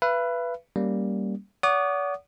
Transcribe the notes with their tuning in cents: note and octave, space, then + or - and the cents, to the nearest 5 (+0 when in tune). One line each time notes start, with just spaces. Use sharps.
B4 +0 E5 +45
G3 +0 A#3 +0 C#4 +0
D5 -45 F#5 +0 D#6 -35